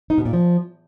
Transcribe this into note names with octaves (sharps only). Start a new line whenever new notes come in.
D#4
B2
A#2
F3